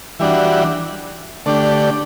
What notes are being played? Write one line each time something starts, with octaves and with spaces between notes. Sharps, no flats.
E3 G3 D4 F#4
D3 A3 D4 G4